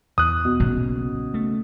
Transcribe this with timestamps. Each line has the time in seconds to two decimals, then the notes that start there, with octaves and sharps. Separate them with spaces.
0.18 E2 E3 D#6 F#6
0.45 B2
0.60 B1 A#2 C#3
1.34 A3